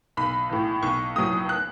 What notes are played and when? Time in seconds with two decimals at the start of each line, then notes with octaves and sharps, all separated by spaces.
0.17 B1 B5
0.50 A2 E3
0.82 B1 C#6
1.15 A2 F#3 D#6
1.49 F#6